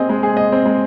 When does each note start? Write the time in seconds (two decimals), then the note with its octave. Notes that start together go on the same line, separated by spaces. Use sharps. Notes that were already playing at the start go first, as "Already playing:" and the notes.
Already playing: C4 G#4 D#5
0.09 G#3
0.23 G#4
0.37 D#5
0.52 C4
0.66 G#3